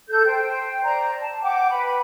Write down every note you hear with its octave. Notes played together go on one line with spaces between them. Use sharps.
A4 G6
C5 G5
C5 D5 A#5
A5
F#5 G5 D6
B4 B5